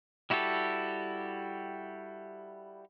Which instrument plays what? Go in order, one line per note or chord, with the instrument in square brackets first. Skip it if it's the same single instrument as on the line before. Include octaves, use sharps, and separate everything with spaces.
[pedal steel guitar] G3 E4 F#4 G4 A4